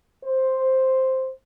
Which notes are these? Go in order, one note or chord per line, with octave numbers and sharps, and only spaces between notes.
C5